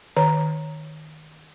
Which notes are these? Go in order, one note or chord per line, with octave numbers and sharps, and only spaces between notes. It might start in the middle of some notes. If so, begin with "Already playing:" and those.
D#3 C#5 A#5